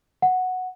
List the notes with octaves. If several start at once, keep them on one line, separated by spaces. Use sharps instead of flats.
F#5